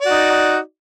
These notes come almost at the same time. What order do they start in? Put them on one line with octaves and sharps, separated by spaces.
D5 F#4 D#4